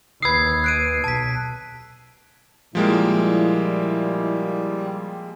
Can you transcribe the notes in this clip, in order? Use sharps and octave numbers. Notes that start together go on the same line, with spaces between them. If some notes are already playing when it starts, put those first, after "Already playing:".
D#2 B4 D#6 E6 G#6 C7
F#6 D7 D#7
B1 A5 B6
A#2 F3 G3 G#3 A#3 E4